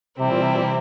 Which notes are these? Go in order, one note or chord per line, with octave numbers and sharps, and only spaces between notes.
C3 E3 G3 C4 E4
A#2
C3
A#2
C3